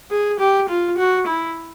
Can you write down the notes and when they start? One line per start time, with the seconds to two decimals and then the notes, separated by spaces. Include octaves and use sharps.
0.11 G#4
0.40 G4
0.69 F4
0.98 F#4
1.27 E4